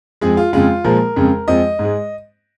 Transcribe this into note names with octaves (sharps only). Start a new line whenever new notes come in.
F2 F3 G#3 G#4
F4
F2 C#3 G#3 F4
A#2 F3 G#3 A#4
F2 C#3 G#3
F2 F3 G#3 D#5
G#2 G#3